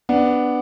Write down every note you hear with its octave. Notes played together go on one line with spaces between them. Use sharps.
B3 D4